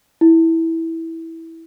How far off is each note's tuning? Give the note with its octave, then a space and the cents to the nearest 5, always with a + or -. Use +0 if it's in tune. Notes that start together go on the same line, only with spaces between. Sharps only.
E4 -10